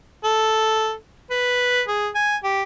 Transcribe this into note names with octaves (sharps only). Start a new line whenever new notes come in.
A4
B4
G#4
G#5
G4